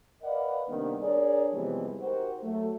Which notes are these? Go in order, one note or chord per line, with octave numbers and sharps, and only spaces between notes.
A#4 B4 D5 D#5 F5 F#5
C3 D#3 G3 A#3 B3 D4
D4 G#4 A#4 C#5 D5
C3 E3 F3 G3 G#3 B3
D#4 F#4 G4 A#4 C5
F#3 A3